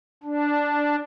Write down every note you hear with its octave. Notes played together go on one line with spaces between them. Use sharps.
D4